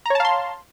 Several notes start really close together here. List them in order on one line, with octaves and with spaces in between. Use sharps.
A#5 C#5 A5 F5 C6